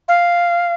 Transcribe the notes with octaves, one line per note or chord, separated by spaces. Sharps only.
F5